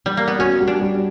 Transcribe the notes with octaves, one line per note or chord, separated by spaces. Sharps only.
G3
A#3
B3
C#4 F#4
G3
D4
G3